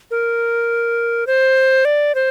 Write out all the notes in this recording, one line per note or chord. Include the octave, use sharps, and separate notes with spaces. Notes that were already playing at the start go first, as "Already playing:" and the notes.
A#4
C5
D5
C5